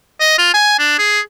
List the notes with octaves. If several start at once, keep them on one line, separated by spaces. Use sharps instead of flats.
D#5
F4
G#5
D4
G#4